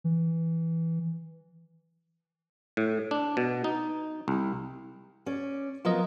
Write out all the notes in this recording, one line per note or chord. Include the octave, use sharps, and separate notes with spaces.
E3
A2
D4
B2
D#4
C2
C#4 D5
F3 F#3 B3 F4 A#4 D#5